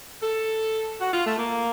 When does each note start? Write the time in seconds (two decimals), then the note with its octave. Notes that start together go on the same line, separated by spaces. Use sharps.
0.23 A4
1.01 F#4
1.13 F4
1.26 A3
1.39 A#3